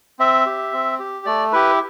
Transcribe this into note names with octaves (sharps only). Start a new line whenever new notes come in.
C4 E5
G4
C4
G4
A3 D5
E4 G4 B4